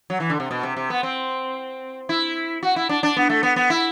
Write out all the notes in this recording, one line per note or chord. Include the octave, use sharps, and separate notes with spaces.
F#3
E3
D3
C3
B2
C3
C3
B3
C4
E4
F#4
E4
D4
D4
B3
A3
B3
B3
E4